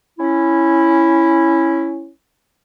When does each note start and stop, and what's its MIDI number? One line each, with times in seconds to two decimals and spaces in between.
0.19 2.10 61
0.19 2.10 64